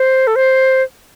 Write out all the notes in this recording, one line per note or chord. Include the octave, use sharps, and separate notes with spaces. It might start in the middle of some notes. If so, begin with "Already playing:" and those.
Already playing: C5
A4
C5